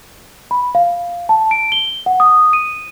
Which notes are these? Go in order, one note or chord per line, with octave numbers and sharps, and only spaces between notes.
B5
F5
A5
D7
G7
F#5
D#6
D#7